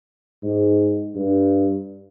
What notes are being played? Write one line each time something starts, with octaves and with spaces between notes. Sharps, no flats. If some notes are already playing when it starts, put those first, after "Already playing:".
G#2
G2